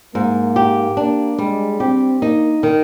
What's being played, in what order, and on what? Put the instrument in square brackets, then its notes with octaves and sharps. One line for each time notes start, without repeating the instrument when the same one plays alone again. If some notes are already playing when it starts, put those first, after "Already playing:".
[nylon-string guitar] G#2 [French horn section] A#3
[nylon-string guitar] G4
[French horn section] A#3 [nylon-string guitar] D4
[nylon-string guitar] G3 [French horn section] G#3
[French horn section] C4 [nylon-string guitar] G4
[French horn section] A#3 [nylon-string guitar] D#4
[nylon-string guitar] D#3